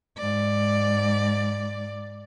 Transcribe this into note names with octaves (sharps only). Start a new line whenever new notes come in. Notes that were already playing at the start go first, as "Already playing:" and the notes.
G#2 D5